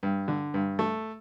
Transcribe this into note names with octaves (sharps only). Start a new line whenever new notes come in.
G2
D3
G2
A3